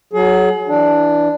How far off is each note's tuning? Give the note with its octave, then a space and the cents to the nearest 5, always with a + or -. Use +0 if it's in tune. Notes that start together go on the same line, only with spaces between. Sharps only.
F#3 +0 G#4 +35
E3 -5 D4 +0